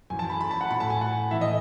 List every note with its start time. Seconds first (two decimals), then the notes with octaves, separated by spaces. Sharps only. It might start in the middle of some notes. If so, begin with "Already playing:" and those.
0.10 F#2 E3 G#5
0.19 A5
0.30 B5
0.41 B5
0.51 A5
0.61 F#5
0.70 A2 F#3 B5
0.80 A5
0.90 G#5
1.01 F#5
1.31 A2 E3 E5
1.41 D#5